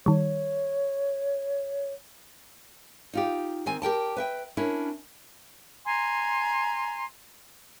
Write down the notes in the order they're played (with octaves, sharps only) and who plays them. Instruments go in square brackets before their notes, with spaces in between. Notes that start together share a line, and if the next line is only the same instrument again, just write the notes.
[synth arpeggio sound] D#3 G3 [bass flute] C#5
[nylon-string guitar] D#4 F4 G4
D#3 C4 G#5
G4 A#4 G5 A5
B4 E5 G5
C#4 D4 E4 A#4
[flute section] G#5 A#5 C6